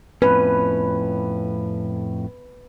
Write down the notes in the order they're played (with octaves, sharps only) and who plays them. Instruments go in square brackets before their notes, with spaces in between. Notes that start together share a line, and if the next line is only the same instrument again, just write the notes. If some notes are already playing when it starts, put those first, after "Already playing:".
[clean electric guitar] F2 A2 C#4 [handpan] B4